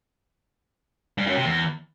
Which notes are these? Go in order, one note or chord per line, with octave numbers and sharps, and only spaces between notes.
G2
F#2
C3
E2